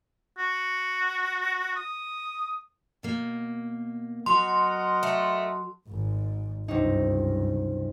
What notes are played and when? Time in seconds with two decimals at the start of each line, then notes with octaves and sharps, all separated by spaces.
0.38 F#4
1.76 D#6
3.03 B2 A#3
4.26 F#3 F#4 A#4 D#5 F#5 C6
5.03 A3
5.88 G#1 G#2
6.68 C#2 G2 C3 F#3 D#4